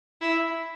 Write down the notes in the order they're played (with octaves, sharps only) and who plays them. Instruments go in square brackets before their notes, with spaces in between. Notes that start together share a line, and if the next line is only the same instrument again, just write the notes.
[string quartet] E4